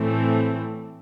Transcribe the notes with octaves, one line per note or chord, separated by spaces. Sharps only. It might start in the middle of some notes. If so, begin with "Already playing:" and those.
Already playing: A2 E3 A3 C4